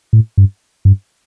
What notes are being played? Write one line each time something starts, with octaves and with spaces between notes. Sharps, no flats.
A2
G2
G2